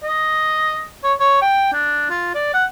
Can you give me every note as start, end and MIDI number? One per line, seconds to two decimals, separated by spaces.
0.03 0.88 75
1.04 1.13 73
1.20 1.39 73
1.42 1.70 79
1.73 2.08 62
2.10 2.32 65
2.35 2.50 74
2.54 2.65 78